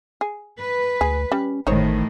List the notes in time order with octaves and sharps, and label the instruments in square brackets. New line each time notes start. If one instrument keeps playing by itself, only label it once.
[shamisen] G#4
[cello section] B4
[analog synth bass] D2 [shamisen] G#4
[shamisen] G3 [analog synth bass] C#4
[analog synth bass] G#1 [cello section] A2 D#3 E3 [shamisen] D#4 C5 C#5